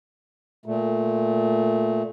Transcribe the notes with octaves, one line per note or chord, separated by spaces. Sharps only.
A#2 A3